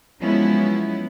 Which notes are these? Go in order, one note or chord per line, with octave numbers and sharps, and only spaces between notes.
F3 F#3 G#3 B3 C#4 E4